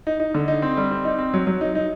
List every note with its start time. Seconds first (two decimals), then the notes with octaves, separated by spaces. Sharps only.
0.07 D#4
0.20 D#4
0.34 D3
0.48 D#4
0.62 C4
0.77 G3
0.91 C4
1.05 D#4
1.19 C4
1.34 F#3
1.47 F#3
1.61 D#4
1.75 D#4